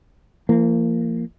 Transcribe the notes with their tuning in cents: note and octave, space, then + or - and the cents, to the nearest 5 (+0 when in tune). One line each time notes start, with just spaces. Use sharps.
F3 -45 A#3 -25